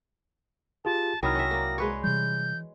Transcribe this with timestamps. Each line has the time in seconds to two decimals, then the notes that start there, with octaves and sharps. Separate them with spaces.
0.85 F4 G4 G#4 A5
1.23 C2 D#3 F#3 E4 G5 D#6 F6 A#6
1.35 C#4 E5
1.51 A#3 D5
1.78 G#3 B4 C#5
2.04 C3 E3 G3 G6